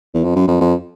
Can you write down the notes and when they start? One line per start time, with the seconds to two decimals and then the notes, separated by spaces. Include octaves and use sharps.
0.14 E2
0.24 F2
0.36 F#2
0.48 F2
0.61 F2